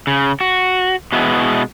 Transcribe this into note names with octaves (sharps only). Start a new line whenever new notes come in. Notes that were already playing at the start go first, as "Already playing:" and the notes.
C#3
F#4
B2 G#3 B3 E4